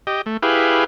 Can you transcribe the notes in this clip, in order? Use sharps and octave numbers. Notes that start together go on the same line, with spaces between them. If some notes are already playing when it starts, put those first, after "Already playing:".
G4 D#5
A3
E4 G4 G#4 B4 F5